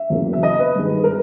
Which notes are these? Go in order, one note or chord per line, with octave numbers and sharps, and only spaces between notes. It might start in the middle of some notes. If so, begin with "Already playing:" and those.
Already playing: E5
E2 C#3 F#3 A#3
E5
D#5
B4
G2 D#3 G#3
A#4